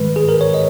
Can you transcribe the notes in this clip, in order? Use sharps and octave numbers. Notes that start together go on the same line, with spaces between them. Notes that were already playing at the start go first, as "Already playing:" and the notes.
Already playing: G#2 D#3 G#3 B4
G#4
A#4
C#5
D#5